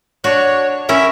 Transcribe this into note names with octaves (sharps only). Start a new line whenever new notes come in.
D4 F#4 C#5
C#4 E4 A#4 E5